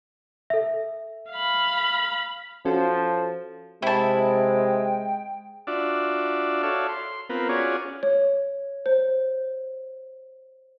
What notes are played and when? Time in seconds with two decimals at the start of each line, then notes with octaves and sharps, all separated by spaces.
0.50 A4 E5
1.31 F5 B5
2.65 F3 C#4 F#4 A4
3.82 C3 G#3 E4 G5 A5
5.67 D4 F4 F#4 D5 E5
6.63 F#4 A4 C#5 D5 E5 F5
6.89 C6
7.30 B3 C4 F4 A#4 B4
7.49 C#4 F4 F#4 G#4 C#5 D5
8.03 C#5
8.86 C5